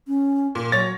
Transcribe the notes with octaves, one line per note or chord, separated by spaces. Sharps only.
C#4
A#2
F#3 C#5 A6 A#6